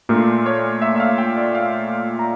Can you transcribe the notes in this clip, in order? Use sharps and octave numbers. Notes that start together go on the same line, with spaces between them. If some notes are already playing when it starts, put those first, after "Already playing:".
A#2 A3 D4 F4 A#4
C#5
E5
E5
F5
G5
D5
F5
A#5